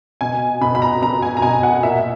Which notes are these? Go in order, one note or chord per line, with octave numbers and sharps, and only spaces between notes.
B2 G#5
B2 B5
B5
A#5
B2 A#5
G#5
A#5
B2 G#5
F#5
A#2 E5